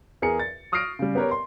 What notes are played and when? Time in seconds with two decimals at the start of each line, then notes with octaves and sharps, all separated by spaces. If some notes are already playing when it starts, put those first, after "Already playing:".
0.22 E2 G#4 A#4 C#7
0.39 A6
0.72 C#6 D#6 F6 A#6 C7 D7
0.99 C#3 G3
1.15 B3 G4 A#4 B4 C#5
1.31 C6